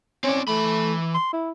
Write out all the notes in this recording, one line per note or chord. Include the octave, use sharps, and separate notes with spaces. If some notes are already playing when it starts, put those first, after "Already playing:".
C4 C#4 D5
E3 A3 B5
C6
E4